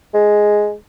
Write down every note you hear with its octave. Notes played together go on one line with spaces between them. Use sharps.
G#3